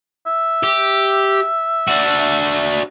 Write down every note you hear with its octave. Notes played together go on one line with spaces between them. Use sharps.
E5
G4
D4 F#4